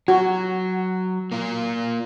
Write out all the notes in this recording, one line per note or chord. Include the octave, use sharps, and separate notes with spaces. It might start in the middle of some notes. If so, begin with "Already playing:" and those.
F#3 F#4
A#3 F4